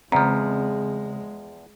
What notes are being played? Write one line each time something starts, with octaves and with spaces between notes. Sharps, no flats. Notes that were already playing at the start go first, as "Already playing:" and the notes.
E2 C#3 F3 G#3 C4 A#5